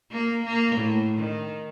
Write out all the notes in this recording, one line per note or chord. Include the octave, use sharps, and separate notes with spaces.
A#3
A#3
A2
D#3